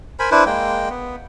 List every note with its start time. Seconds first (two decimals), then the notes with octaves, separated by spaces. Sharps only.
0.19 A#4 C5 G#5 B5
0.31 D4 E4 B4 C5
0.46 G#3 A#3 G5
0.90 B3